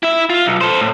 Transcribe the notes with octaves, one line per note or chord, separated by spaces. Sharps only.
E4 E5
F4
B1
A4 C5
A2